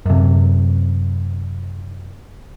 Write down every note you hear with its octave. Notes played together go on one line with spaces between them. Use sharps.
F#2 C3